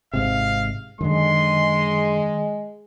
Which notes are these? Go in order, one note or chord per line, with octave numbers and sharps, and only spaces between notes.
G#1 G#2 C3 F5
F#2 D3 D#3 G#3 C6